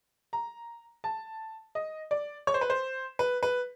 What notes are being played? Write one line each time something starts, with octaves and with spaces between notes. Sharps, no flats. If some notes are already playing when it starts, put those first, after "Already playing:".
A#5
A5
D#5
D5
C#5
C5
B4
C5
B4
B4